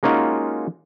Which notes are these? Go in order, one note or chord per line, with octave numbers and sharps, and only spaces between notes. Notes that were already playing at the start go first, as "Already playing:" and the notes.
G#3 A#3 C#4 D#4 F4 F#4